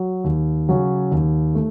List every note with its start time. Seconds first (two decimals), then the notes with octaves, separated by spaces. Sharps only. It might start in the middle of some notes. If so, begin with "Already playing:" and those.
Already playing: F#3
0.24 D#2
0.69 C#3 F#3 C#4
1.12 D#2
1.55 A3